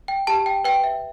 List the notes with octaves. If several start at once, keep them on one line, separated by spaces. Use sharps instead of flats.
G5
G4 A5
G5
B4 G5
E5